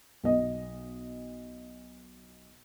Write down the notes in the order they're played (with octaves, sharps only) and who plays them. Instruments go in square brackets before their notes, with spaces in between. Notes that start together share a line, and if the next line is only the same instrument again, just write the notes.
[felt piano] B1 D#5